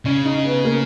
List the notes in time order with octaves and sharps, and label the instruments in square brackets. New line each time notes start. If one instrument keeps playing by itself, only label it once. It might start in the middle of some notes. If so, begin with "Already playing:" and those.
[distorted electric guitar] C#3 [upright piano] C#4
[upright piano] D#4
B3
A#3